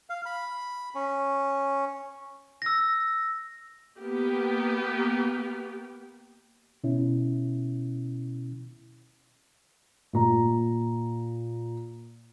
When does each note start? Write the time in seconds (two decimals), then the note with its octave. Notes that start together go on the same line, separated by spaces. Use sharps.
0.10 F5
0.26 B5
0.95 C#4
2.62 E6 A#6
4.00 A#3 B3 G4
6.84 B2 C#4 E4
10.13 A#2 A#5